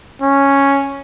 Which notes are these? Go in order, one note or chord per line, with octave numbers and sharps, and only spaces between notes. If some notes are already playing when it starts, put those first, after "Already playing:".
C#4